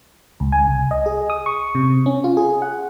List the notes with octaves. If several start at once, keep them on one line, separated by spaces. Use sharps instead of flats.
C#2
G#5
C2
D#5
G#4
D#6
C#6
C3
C#4
F4
G#4
F#5